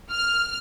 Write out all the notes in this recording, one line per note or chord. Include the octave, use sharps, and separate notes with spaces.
F6